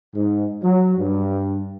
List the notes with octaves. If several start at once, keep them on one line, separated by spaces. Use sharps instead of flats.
G#2
F#3
G2